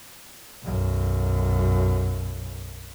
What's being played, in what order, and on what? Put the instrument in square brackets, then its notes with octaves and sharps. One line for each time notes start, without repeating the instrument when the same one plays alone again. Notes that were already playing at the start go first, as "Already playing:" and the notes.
[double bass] B1 F#2